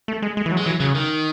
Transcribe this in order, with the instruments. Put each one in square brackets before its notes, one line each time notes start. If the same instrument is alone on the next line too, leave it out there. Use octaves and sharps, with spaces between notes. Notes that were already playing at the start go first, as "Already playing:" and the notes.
[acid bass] A3
G#3
G#3
E3
F#3
[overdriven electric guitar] G#3
[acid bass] E3 [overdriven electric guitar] F#3
[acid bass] C#3 [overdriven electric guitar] F#3
[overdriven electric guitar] D#3